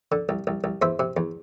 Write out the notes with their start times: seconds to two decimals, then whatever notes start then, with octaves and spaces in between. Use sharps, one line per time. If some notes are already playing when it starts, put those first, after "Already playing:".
0.12 D3
0.29 C2
0.47 C2
0.64 C2
0.82 E2 C5 E5
0.99 C3
1.17 E2